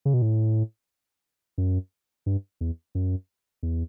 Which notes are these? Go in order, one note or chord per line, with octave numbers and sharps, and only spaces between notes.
C#3
B2
A2
F#2
G2
E2
F#2
E2